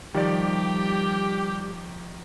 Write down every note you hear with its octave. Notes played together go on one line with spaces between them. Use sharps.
D#3 F3 G3 G4 D5